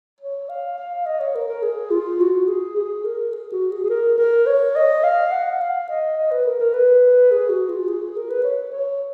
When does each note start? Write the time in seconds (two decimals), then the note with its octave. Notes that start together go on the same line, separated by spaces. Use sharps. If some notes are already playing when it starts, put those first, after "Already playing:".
0.21 C#5
0.49 F5
0.78 F5
1.06 D#5
1.20 C#5
1.35 A#4
1.49 A#4
1.63 G#4
1.91 F4
2.20 F#4
2.48 G#4
2.77 G#4
3.05 A#4
3.33 G#4
3.52 F#4
3.72 G#4
3.84 G#4
3.90 A#4
4.18 A#4
4.47 C#5
4.76 D#5
5.04 F5
5.32 F#5
5.61 F5
5.90 D#5
6.17 D#5
6.32 B4
6.46 A#4
6.60 A#4
6.74 B4
7.32 G#4
7.50 F#4
7.69 F4
7.88 G#4
8.03 G#4
8.17 A#4
8.30 B4
8.44 C#5
8.72 C#5